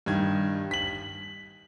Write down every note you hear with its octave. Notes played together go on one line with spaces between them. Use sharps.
G2 D#3 G#6
B6 F#7